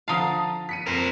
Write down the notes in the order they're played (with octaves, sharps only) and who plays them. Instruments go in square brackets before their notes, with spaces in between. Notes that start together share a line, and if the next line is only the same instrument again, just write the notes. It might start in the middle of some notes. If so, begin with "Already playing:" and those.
[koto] D3 F3 F5 [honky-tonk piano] A5 A#5 D#6
[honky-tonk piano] B6 C#7 D#7
[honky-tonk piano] F2 [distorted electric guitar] A#4 C5